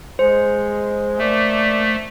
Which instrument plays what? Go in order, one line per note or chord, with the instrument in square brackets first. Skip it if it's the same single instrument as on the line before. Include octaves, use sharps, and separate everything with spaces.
[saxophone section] G#3 [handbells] C5
[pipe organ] A3 [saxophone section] A#3 D5